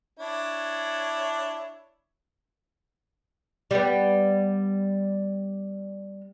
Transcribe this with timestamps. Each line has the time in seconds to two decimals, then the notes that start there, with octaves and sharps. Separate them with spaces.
0.19 D4 E4 C#5
3.71 G3 B3